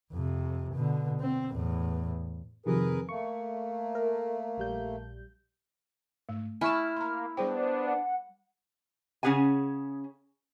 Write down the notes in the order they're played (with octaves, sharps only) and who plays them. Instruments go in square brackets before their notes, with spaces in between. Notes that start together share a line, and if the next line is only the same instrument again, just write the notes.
[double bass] F2 C3
B2 D3
C4
E2 A2
[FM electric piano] F2 C3 D#3 [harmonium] G#4 A#4 B4
[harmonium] A3 A#3 [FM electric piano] C#6
[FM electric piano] A#4
A#1 G3 G6
[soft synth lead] G#2 [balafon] A3
[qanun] E4 A5 [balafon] G#5 B5 C#6 [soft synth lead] F6
[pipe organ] A#3 [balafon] A#5 C6
[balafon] G3 G#4 G5 [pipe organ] B3 D4 [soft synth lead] C5
[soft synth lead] F#5
[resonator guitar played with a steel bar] C#3 C#4 G#4 F#5 G#5